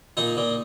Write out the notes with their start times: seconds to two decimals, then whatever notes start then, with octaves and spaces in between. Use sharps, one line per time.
0.17 A#2 D#4
0.37 A#2